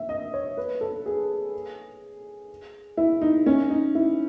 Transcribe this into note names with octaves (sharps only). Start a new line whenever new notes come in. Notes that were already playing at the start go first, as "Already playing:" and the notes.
Already playing: E5
D#5
C#5
B4
A4
G#4
E4
D#4
C#4
D#4
E4